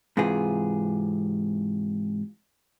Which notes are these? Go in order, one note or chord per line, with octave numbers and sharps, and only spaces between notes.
G#2 C3 E3 F4 G#4